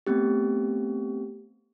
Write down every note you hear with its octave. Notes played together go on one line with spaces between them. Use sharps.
A3 B3 C4 G4